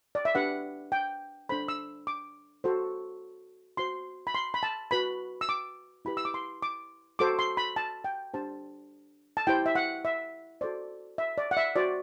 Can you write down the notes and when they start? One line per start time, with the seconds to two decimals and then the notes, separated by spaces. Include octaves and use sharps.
0.15 D5
0.25 E5
0.35 D4 G4 B4 F#5
0.92 G5
1.49 D4 A4 C5 B5
1.68 E6
2.07 D6
2.64 F#4 A4 C5
3.77 F#4 C5 C6
4.27 B5
4.35 C6
4.54 B5
4.63 A5
4.91 F#4 B4 B5
5.41 E6
5.49 D6
6.05 E4 G4 B4 B5
6.17 E6
6.25 D6
6.34 C6
6.62 D6
7.19 F#4 A4 C5 D6
7.39 C6
7.57 B5
7.76 A5
8.05 G5
8.34 D4 G4 C5 A5
9.37 A5
9.47 E4 G4 C5 G5
9.66 E5
9.75 F#5
10.05 E5
10.61 F#4 A4 C5 D5
11.18 E5
11.38 D5
11.51 F#5
11.57 E5
11.76 F#4 C5 D5